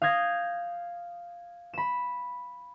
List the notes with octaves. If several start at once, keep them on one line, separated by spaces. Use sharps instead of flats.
F5 D#6 G6 G#6 A#6
B5 E7